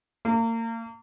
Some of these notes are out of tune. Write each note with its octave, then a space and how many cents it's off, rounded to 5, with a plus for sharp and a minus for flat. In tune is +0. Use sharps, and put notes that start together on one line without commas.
A#3 -35